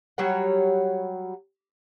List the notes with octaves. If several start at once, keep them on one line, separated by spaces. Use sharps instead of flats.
F#3 G3 C#5 F#5